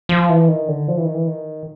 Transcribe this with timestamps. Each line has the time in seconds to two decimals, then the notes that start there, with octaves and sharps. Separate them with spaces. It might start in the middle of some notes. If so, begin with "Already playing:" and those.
0.09 F3
0.29 E3
0.48 D#3
0.68 D3
0.88 F3
0.97 E3
1.05 D#3
1.14 E3
1.27 D#3